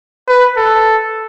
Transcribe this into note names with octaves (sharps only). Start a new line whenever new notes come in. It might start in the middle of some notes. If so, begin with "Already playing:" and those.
B4
A4